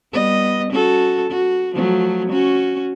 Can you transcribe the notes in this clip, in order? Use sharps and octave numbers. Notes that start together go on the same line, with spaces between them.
G3 B3 D#5
C#4 F#4 A4
F#4
F3 F#3 A3
C#4 F#4